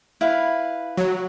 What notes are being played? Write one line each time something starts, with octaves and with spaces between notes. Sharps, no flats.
E4 B4 F5
F#3